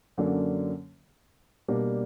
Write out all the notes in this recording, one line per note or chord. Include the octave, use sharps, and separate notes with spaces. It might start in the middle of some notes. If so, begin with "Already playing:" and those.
F#2 D3 F#3 A#3 D4
B2 G3 A#3 D4